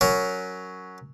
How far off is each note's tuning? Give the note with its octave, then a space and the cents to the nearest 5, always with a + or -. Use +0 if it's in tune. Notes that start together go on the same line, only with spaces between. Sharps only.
F#3 +0 C#4 +5 A#4 -10